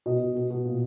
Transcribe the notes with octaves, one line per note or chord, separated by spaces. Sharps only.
B2 D#5
B2
B2
B2
A#2